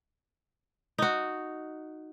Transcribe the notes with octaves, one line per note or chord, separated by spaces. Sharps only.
D#4 F#4